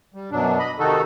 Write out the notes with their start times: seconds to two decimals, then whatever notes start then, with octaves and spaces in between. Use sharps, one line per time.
0.14 G3
0.31 F#2 B2 F#3 D4
0.59 D#5 B5
0.79 C3 D#3 D#4 F#4 A4